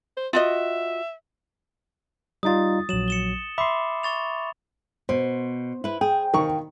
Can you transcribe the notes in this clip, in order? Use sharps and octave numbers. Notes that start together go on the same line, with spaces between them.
C5
F4 F#4 D#5 E5
G3 D#4 F4 D#6 A6
A#1 F#3 E7 F#7
C#7 E7 G7
E5 B5 C6 D6
C#6 A6 F7
B2 C5
E4 B4
G#4 G5
D#2 D#3 C#6